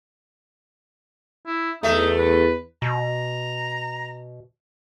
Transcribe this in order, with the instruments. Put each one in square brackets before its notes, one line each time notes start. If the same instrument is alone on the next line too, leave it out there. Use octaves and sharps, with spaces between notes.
[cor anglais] E4
[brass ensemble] E2 [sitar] A3 E5 [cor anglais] D#4
[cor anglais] B4
[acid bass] B2 [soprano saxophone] A#5